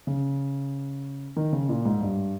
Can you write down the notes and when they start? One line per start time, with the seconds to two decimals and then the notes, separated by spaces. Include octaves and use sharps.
0.07 C#3
1.36 D#3
1.52 C#3
1.69 A#2
1.85 G#2
2.01 G2